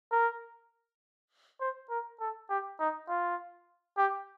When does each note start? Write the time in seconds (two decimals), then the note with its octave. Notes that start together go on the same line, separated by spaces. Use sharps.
0.12 A#4
1.61 C5
1.90 A#4
2.20 A4
2.49 G4
2.80 D#4
3.09 F4
3.98 G4